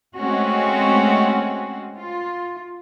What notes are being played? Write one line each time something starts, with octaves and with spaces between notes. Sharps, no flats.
G#3 A3 C4 C#4 F#4
F4